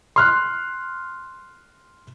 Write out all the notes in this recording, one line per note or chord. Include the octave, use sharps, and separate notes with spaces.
C6 F6 F#6